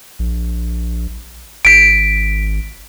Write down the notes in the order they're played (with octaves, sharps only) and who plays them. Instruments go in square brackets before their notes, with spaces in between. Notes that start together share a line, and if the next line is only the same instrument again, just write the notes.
[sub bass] A#1
[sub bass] G#1 [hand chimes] B6 D7